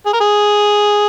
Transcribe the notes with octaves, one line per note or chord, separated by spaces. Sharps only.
G#4
A#4
G#4